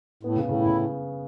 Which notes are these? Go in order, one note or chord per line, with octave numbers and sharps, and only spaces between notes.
A2 B3
C#3
A2
C#3
C#3 E4